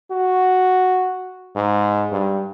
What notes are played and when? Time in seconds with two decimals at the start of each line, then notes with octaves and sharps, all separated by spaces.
0.11 F#4
1.56 G#2
2.12 G2